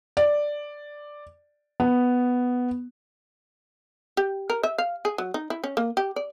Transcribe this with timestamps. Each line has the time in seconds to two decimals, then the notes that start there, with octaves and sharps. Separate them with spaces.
0.17 D5
1.80 B3
4.17 G4
4.50 A#4
4.63 E5
4.78 F5
5.05 G#4
5.18 F#3
5.34 D#4
5.50 E4
5.64 C#4
5.77 A#3
5.97 G4
6.16 D5